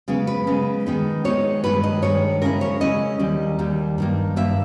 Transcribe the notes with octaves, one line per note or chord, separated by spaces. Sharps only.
C#3 G#3 B3
B4
C#3 G#3 B3
D#3 G#3 B3 D#4
D#3 G#3 B3 D#4 C#5
G2 D#3 G#3 B4
D#5
G2 D#3 G#3 C#5
C#3 G#3 C#4 E4 A#4
C#5
C#3 G#3 C#4 E4 D#5
D#2 D#3 G3
D#2 D#3 G3
G2 D#3 A#3
G2 D#3 A#3 E5